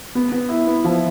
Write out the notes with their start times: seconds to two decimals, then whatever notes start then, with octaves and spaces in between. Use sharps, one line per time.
0.15 B3
0.32 B3
0.49 E4
0.67 B3
0.84 F3